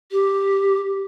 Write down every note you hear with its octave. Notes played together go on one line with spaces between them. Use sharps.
G4